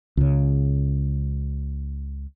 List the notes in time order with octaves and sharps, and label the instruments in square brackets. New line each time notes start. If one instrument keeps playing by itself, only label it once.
[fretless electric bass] C#2 C#3